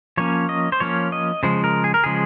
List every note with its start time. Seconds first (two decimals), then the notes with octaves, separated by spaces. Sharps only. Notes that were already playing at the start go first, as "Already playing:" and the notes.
0.17 F3 A#3 C#4 C#5
0.49 D#5
0.72 C5
0.80 F3 A#3 C#4 C#5
1.12 D#5
1.43 C#3 F3 G#3 C5
1.64 A#4
1.84 G#4
1.94 A#4
2.04 C#3 F3 G#3 G#4